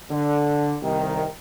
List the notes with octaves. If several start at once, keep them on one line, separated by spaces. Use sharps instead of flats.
D3
C2 D#3